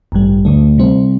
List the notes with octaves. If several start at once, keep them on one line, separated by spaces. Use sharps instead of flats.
A1 G2 G3
D2 D3 A3
C3 G3 C4